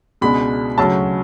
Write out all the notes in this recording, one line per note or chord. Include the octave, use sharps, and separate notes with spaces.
C#2 B2 G#3 D4 B5
D2 C#3 F#3 C#4 A5